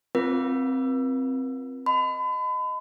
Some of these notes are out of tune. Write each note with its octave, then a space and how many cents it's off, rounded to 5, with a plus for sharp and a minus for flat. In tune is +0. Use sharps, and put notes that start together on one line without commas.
C4 +0 F4 +0 A#4 +45
D#5 +0 B5 +40